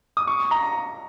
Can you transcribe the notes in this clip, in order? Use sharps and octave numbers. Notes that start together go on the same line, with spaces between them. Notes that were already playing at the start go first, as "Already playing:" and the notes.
D#6
C#6
A#5